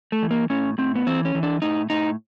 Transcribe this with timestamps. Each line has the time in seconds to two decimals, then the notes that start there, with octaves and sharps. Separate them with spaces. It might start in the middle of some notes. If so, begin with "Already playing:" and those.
0.12 A3
0.22 E3
0.31 A#3
0.50 A2 C#4
0.78 A2 C4
0.95 B3
1.07 E3 C4
1.25 C#4
1.35 E3
1.43 D4
1.62 A2 D#4
1.90 A2 D#4